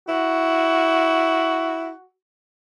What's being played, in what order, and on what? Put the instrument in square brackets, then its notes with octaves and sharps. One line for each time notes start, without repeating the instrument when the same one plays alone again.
[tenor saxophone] E4 [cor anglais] F#4